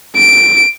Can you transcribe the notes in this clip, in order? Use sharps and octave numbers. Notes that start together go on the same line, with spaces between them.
D7